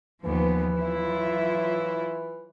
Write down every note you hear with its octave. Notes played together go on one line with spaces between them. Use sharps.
D#2 E3 F3 B3
F#3 E4 F4